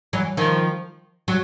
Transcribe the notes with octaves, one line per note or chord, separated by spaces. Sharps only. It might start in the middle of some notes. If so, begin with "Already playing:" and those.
E3 F#3
D#3 F3
F#3